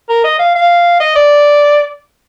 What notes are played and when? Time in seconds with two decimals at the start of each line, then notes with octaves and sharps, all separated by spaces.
0.09 A#4
0.24 D#5
0.39 F5
0.55 F5
1.00 D#5
1.15 D5